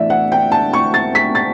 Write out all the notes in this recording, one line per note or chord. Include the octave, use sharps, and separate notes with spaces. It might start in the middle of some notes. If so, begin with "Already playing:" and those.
Already playing: A2 E3 A3 D5 E5
F#5
G5
A5
C#6
A6
B6
A6